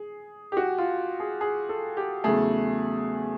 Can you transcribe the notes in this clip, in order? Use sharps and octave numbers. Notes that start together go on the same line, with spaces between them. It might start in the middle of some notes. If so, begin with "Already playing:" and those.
Already playing: G#4
G4
F#4
F4
G#4
G#4
A4
G4
E2 C#3 F#3 A3 G#4